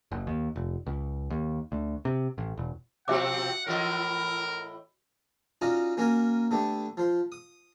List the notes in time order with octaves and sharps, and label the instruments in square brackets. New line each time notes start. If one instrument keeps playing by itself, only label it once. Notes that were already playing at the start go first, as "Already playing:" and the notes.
[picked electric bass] F#1
D#2
F1
C#2
D#2
D2
C3
A1
E1
[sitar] B2 F3 C4 [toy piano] F#4 E5 D6 [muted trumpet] F#5
[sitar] A2 E3 D#5 [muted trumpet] A#4
[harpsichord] C#4 D#4 F4 F#4 D5 D#5
A#3 C#4 F#4 A#4 G#5
D3 A3 B3 G4
F3 C5
D#6